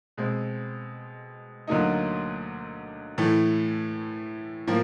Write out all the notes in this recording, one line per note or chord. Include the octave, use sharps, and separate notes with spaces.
B2 G#3 C4
D2 D3 F#3 A#3 D#4
A2 E3 A3
A2 F3 A#3